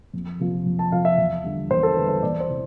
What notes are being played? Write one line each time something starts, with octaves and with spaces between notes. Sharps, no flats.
F2
C3 F3
F2
A5
C3 F3 F5
E5
E2
D3 G3
E2 C5
A4
D3 G3 B4
C5
E2 D5
C5
C3 E3